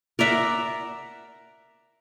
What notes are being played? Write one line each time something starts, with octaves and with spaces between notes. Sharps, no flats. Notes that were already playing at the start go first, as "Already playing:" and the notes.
A#4 D5 E5 F#5